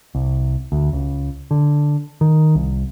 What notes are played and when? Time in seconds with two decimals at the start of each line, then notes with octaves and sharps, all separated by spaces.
0.15 C2
0.72 D2
0.93 C#2
1.51 D3
2.21 D#3
2.55 C2